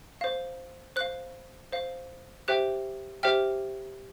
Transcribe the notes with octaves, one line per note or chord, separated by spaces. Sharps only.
C5 F5
C5 F5 F#6
C5 F5
G4 C5 E5 G5 F#6
G4 C5 E5 G5 F6